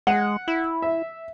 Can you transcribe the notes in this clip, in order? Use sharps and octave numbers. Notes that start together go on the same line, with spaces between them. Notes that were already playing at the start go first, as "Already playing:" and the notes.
G#3 F#5
E4
E5